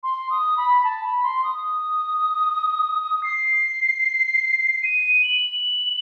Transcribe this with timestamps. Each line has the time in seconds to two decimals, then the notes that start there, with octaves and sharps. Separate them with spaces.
0.03 C6
0.30 D#6
0.57 B5
0.84 A5
1.04 B5
1.23 C6
1.44 D#6
3.23 C7
4.83 D#7
5.23 F#7